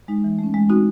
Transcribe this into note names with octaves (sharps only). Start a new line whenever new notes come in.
G#3 D#4
E3
A3 C#4
G#3
C4 D#4 F#4